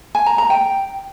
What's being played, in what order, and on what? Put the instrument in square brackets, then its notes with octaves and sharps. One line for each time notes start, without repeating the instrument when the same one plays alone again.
[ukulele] G#5
A#5
A#5
G5